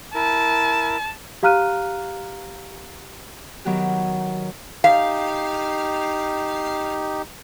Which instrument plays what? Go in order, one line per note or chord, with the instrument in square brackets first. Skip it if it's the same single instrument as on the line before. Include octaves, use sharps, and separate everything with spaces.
[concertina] E4 A#4 [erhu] A5
[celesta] G4 F5 A#5 F6 F#6 D#7
[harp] D#3 F#3 B3 G4
[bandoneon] D#4 G4 [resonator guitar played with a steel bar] F5